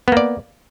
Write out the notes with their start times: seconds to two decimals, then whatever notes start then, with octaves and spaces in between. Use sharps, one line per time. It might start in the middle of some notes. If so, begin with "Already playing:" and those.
0.08 B3
0.12 A#3
0.17 D5